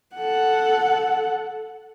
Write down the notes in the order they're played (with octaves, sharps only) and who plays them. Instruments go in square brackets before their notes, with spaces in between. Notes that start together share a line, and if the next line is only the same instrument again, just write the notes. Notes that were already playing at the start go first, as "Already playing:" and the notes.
[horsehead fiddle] A4 F#5